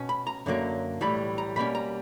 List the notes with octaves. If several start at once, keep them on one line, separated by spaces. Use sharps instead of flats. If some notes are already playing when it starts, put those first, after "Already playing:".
Already playing: B2 C#4
B5
A#5
F#2 D3 F#3 A#3
B1 A2 E3 G3 B5
A#5
B2 G3 A#3 C#4 B5
A#5